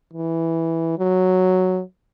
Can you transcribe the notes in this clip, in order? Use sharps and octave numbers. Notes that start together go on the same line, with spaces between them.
E3
F#3